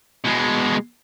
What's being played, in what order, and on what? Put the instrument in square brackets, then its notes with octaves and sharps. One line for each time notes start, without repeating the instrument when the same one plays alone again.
[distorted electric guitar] B2 G#3